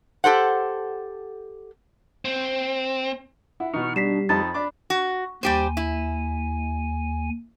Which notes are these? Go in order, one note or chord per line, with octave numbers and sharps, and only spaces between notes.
G4 A4 C5 F#5
C4
E4 F#5
B2 E3 D#4 C#6 F6
G3 D4 B6 C7 E7
F2 D#4 A5 B5 A6
D4 D6
F#4
D#2 G3 G4 C5 G#5
E4